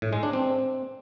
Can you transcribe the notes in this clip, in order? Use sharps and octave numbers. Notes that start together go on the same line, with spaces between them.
A2
G#3
D4
C4